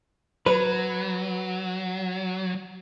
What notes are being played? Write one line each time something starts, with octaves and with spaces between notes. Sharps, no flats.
F#3 B4